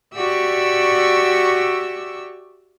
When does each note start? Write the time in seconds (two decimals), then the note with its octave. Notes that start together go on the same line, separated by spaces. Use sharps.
0.16 F#4 G4 D5 E5 C#6 E6